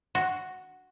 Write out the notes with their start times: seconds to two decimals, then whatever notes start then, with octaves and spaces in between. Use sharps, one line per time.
0.15 F#4